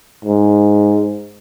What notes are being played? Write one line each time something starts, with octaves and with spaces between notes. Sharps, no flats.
G#2